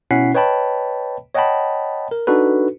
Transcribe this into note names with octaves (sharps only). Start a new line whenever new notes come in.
B2 C#4 E4 F#5 B6 C7
B4 C#5 D#5 G5 A5 B5
C#5 D#5 F#5 G5 A5 B5
A#4
D4 D#4 F#4 A4 B4